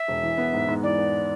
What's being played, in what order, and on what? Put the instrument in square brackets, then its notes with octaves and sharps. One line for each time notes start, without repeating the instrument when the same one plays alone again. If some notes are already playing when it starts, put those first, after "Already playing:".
Already playing: [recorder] E5
[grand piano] E1
E3
B3
G#2
G#2
[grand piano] E3 [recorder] D5
[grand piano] B3